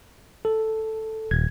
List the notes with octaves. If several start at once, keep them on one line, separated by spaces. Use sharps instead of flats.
A4
D#1 G#6